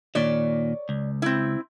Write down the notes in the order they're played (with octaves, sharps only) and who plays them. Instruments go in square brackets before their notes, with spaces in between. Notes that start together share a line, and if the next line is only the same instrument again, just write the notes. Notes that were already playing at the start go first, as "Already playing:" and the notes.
[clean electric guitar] D#2 A#2 D#3 [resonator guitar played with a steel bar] C#5 D5
[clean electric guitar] C#2
[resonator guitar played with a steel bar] C4 E4